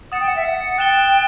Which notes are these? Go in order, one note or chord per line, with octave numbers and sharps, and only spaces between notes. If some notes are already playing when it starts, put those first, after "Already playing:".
F#5 D#6 A6 E7
G5
F#5
E5
F#5
G5 F#6 A6 E7 G7